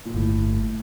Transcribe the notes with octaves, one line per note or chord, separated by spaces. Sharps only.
A#2
G1 A2